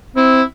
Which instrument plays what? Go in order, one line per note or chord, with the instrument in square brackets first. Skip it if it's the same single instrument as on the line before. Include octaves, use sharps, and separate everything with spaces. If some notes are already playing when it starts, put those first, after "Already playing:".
[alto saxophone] C4 [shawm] E4